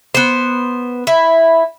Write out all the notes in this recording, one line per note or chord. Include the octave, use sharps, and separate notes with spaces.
B3 C5
E4